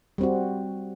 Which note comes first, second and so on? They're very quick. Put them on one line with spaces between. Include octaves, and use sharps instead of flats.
G3 C4 F#4